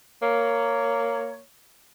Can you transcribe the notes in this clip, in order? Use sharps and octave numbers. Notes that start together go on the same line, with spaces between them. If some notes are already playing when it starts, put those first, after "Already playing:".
A#3 C#5